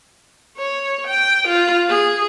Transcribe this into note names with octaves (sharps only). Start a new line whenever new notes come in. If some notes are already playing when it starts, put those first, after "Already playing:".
C#5
G5
F4
G#4